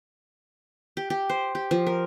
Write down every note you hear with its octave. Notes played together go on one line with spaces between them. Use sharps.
G4
G4
C5
G4
F3
A#4